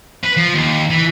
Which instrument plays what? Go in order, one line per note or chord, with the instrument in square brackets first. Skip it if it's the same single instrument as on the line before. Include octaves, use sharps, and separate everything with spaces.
[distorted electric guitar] B4
F3
D#2
E3